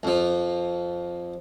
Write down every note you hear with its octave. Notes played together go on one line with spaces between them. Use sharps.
F2 F3